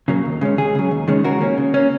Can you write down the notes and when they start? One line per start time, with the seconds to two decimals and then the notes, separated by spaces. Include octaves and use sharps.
0.08 C#3 F#3 A#3
0.25 D#2
0.41 C#3 G#3 C#4
0.57 C#2 G#4
0.75 C#3 F#3
0.91 D#2
1.08 D#3 G#3 C#4
1.24 C#3 F#4 A#4
1.41 A#3 C#4
1.58 C#3
1.74 A#3 C#4